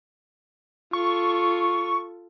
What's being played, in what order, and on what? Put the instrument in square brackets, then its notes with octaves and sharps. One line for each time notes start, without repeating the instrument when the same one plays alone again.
[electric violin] F4 A4 [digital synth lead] C#6